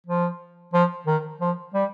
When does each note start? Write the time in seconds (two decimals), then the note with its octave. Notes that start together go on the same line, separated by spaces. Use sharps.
0.07 F3
0.74 F3
1.07 D#3
1.41 F3
1.74 G3